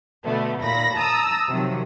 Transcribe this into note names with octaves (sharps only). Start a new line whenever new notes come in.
B2 D3 A3 B3
D#2 A#2 B5 A#6
A5 A#5 D#6 E6
C3 D#3 F3 F#3